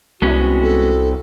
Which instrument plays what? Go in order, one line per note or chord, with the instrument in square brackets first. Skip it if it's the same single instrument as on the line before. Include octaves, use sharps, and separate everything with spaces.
[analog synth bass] C2 [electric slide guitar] G#3 B3 C#4 [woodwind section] F#4
[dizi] A4